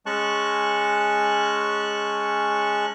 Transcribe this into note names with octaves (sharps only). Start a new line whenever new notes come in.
G#3 C#4 A5 C#6 F#6